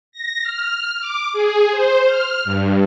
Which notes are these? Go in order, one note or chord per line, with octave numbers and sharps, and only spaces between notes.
A#6
F6
D6
G#4
C5
F6
G2